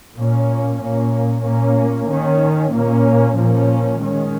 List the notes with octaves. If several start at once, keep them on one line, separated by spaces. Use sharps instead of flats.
A#2 A#3 C#4
A#2 A#3 C#4
A#2 A#3 C#4
D#3 C#4
A#2 A#3 C#4
A#2 F3 A#3 C#4
D#3 G#3 C#4